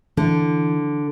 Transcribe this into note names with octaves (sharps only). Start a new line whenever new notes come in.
D3 E3